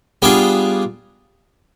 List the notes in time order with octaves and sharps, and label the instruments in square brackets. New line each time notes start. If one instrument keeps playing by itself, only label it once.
[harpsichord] G3 B3 D4 F4 G#4